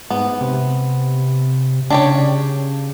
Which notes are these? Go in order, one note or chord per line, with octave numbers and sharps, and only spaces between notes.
G#2 B3
C3
C#3 D4 G4 C#5